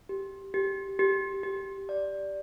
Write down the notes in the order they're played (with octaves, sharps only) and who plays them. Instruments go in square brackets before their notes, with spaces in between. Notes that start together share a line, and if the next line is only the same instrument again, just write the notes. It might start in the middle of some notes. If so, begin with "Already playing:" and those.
[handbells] G4
G4
G4
G4
D5